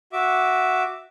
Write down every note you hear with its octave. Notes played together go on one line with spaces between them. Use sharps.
F#4 E5 D6